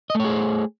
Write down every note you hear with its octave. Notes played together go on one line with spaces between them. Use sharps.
A3 G#4 C5 C#5 D#5